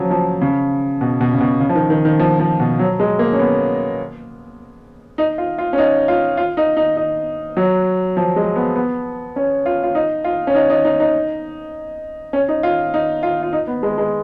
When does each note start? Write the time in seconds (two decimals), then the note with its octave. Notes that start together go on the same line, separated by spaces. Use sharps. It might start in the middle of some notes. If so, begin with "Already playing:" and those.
Already playing: C#3 F3 F#3
0.11 F3
0.41 C#3
1.01 B2
1.21 B2
1.33 C#3
1.41 B2
1.60 C#3
1.69 F3
1.75 D#3
1.90 D#3
2.05 D#3
2.19 F3
2.40 F3
2.60 B2
2.79 F#3
3.00 G#3
3.19 A#3
3.33 C#4
3.39 B3
5.18 D#4
5.38 F4
5.58 F4
5.73 C#4
5.78 D#4
6.08 F4
6.37 F4
6.57 D#4
6.77 D#4
6.97 D#4
7.57 F#3
8.17 F3
8.36 G#3
8.56 B3
8.76 B3
9.36 C#4
9.66 F4
9.83 F4
9.95 D#4
10.24 F4
10.47 C#4
10.55 D#4
10.70 D#4
10.85 D#4
11.00 D#4
12.33 C#4
12.48 D#4
12.63 F4
12.94 D#4
13.23 F4
13.43 F4
13.53 D#4
13.67 B3
13.83 G#3
13.98 G#3